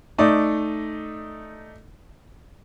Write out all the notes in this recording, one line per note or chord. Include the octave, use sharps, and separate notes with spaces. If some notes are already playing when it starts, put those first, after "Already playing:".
A3 D#4 D5